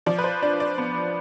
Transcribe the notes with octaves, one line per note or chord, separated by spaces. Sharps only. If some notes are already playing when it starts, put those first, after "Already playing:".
F3 D5
B4
C5
D4 D5
D5
B3